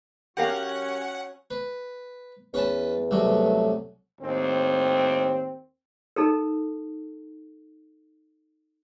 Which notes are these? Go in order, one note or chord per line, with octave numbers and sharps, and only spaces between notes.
F#3 C#4 G4 A#4 F5 F#5
B4
E2 C#4 B4 A5
C2 F#3 A3
D#2 A2 C4
D#4 A4 A#4